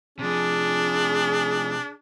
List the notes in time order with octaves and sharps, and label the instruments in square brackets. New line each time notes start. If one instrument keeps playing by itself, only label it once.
[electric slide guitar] C3 F3 [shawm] D4 [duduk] G#4